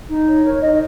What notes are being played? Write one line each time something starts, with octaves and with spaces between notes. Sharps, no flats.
D#4
C#5
A#4 C#5
D#4 D#5